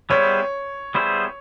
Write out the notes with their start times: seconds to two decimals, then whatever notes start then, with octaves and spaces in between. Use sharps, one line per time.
0.10 G3 B3 E4 G#4 C5 C#5
0.95 G3 B3 E4 G#4 C5